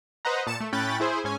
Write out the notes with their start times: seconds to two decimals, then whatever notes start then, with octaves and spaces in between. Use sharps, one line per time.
0.25 B4 C5 D#5 F#5 A#5
0.47 A#2 A5 C#7 E7
0.60 A3
0.73 A2 C#4 G5 B5 F#6 A6
1.00 E4 G#4 C5
1.24 G#2 C#4 G#5